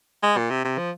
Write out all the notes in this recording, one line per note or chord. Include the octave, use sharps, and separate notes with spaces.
G#3
A#2
C3
C3
F3